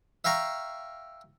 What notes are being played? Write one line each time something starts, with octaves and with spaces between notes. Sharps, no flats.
E5 F5 G5 A#5 C#6